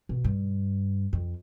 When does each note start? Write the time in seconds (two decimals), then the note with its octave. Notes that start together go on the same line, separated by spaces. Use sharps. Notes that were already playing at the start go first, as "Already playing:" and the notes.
0.09 B2
0.24 G2
1.13 F2